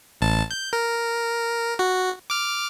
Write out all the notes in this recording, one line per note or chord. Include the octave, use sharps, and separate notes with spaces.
A1 A5
G6
A#4
F#4
D6 F6